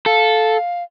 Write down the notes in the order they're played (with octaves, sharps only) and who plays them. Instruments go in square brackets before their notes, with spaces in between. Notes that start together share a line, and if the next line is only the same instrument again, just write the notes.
[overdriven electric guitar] A4 [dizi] F5